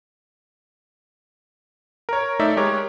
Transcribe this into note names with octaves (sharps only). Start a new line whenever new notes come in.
A#4 C#5
A3 D#4 D5 E5
G#3 G4 A#4 C#5 D6